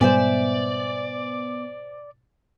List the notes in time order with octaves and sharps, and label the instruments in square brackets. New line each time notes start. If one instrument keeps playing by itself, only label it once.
[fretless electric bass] G#2 B2 G3 [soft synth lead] B3 [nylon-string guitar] C5 E5 G#5 [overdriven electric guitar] D5